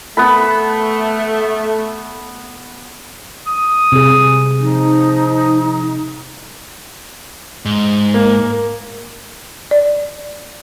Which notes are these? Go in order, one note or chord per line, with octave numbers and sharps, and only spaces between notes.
A3 B3 B4 B5
D#6
C3 G#4
F3 D#4
G#2
A#3
D5